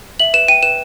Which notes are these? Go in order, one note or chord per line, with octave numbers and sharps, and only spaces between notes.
E5 F#7
B4 E7
G5 D#7
B4 E7